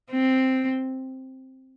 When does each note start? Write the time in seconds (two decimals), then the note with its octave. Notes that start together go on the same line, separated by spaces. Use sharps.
0.11 C4